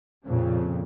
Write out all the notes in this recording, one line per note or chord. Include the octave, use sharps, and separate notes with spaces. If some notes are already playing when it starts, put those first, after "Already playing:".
F2 A#2 C#3